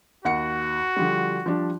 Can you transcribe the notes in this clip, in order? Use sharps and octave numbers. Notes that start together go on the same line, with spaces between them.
D#2 F#4 F#5 C#7
D3 F3 G3
F3 G3 D4